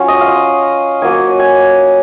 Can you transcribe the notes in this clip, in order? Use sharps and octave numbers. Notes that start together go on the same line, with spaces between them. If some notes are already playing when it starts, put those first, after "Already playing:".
Already playing: F#3 C#4 F4
D#5
F5
D#5
F#3 A#3 D#4 G#5
G#5